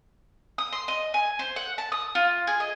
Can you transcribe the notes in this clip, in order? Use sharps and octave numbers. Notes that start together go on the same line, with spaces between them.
D#6
C6
D#5
G#5
C5
F#5
A5
D#6
F4
G#4
D#5